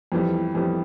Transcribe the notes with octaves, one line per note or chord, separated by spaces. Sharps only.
F2 E3 G3
F2 E3 G3